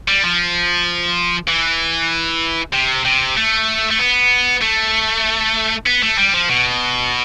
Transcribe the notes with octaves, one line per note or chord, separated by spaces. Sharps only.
G3
F3
E3
C3
C3
A3
A3
B3
A3
B3
A3
G3
F3
B2